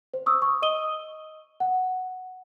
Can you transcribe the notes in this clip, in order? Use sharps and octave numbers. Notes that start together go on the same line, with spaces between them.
C5
C#6 D#6 E6
C#6
D#5 D#6 D#7 G7
F#5